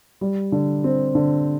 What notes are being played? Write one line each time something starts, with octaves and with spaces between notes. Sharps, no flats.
G3
D3
C4
D3